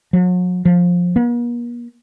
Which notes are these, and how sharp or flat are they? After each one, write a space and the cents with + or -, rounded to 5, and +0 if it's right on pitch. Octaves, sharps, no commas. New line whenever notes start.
F#3 -40
F3 +15
A#3 +45